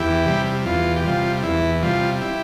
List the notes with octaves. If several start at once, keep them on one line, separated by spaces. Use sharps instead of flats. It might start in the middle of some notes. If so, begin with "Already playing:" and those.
Already playing: E2 E4 G4
C3 G3
E2 F4
G4
C3 G3 F4
E2 E4
C3 G3 F4
E4 G4